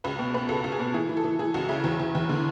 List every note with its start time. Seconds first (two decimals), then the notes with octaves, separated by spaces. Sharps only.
0.04 C#2 B4
0.19 B2
0.34 B2 B4
0.49 C#2 A4
0.64 C#2
0.72 G#4
0.79 B2
0.94 E3 G#4
1.09 E3
1.17 A4
1.24 E3
1.39 E3 G#4
1.54 C#2 F#4
1.69 C#3 E4
1.84 E2
2.00 E2
2.15 E2
2.29 D3